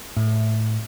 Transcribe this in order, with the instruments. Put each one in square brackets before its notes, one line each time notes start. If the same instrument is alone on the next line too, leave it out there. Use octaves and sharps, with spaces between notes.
[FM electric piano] A2